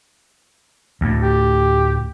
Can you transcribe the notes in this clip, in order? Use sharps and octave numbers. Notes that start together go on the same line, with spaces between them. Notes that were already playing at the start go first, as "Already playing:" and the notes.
D2 A2
G4